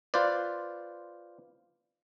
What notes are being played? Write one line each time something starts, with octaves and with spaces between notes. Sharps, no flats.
F4 B4 C5 D5